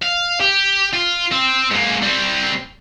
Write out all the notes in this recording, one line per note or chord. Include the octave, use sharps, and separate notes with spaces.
F5
G4
F4
C4
G#2 A#3
G3 C4